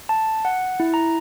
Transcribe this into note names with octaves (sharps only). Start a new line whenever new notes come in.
A5
F#5
E4
A#5